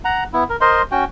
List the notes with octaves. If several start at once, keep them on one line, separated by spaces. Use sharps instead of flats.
F#5 A#5
B3 E4
A#4
A#4 C5 D#5 C6
C#4 F#4 G5